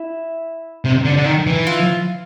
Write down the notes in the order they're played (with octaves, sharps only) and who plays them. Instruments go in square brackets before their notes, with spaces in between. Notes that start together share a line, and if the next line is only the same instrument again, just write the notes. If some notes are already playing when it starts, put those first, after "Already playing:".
Already playing: [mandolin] E4
[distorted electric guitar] C3
D3
D3
D#3
E3
[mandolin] F4